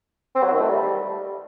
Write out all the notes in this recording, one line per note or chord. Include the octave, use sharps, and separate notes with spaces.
C4
F#3
D#3
A3
G3